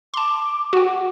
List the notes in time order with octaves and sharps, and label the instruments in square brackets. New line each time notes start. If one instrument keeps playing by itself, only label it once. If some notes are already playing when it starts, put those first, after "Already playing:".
[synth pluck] A5 C6 [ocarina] D6
[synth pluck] F#4 G5 [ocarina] F#5